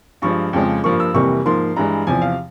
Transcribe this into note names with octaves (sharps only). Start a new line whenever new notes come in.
G2 F3 G#3 C#6
F2 C#3 F3 G#3
G2 F3 A#3 C#6
E6
F2 C3 E3 G3 A#3 C#6
G#2 F3 A#3 C6
G2 E3 G#3 A#5
E2 C3 F3 G#5
F5